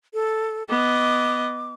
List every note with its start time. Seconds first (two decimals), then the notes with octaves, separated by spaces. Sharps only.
0.14 A4
0.69 B3 D#5 D6